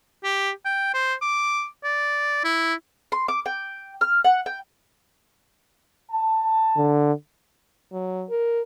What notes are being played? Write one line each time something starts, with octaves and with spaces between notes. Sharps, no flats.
G4
G5
C5
D6
D5
E4
C6
D6
G5
F6
F#5
G5
A5
D3
F#3
A#4